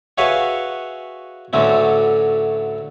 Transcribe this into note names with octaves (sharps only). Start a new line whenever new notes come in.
F#4 G#4 B4 C#5 E5 F5
D2 A2 D3 F#3 A3 C#4